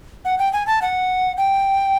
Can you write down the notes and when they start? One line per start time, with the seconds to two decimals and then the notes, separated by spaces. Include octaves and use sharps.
0.25 F#5
0.39 G5
0.53 G#5
0.67 A5
0.82 F#5
1.37 G5